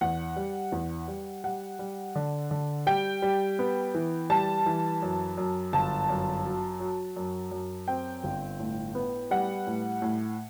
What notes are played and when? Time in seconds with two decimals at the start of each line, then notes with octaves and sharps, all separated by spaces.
0.01 E2 F#5
0.36 G3
0.72 E2
1.08 G3
1.44 G3 F#5
1.79 G3
2.15 D3
2.51 D3
2.86 G3 G5
3.22 G3
3.59 B3
3.94 E3
4.30 G3 A5
4.66 E3
5.02 F#2
5.38 F#2
5.73 G1 A5
6.09 F#2
6.44 F#3
6.80 F#3
7.16 F#2
7.51 F#2
7.88 C4 G5
8.24 G1
8.60 A2
8.95 B3
9.31 G3 F#5
9.67 A2
10.02 A2